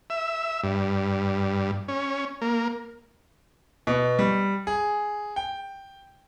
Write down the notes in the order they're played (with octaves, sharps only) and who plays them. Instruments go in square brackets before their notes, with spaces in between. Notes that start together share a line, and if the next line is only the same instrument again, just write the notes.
[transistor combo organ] E5
G2
C#4
A#3
[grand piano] B2
G3
G#4
G5